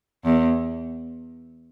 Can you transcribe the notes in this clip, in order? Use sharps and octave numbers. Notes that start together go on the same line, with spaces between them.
E2